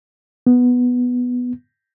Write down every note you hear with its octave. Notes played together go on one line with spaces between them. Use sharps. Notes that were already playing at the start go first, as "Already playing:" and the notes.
B3